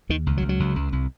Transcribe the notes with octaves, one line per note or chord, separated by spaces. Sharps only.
D#2 D#3
C#2
F#3
C#2
F#3
C#2
C#2
C2